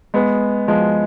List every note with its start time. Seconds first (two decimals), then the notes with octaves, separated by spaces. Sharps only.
0.14 G#3 B3
0.68 F3 G#3